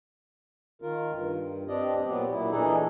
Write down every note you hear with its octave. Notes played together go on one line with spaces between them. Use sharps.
D#3 F4 A#4
G2
C4 D4 G4 D5 D#5
A#2 F#3 B3 G4
A#2 E4
E3 D4 D#4 G#4 A4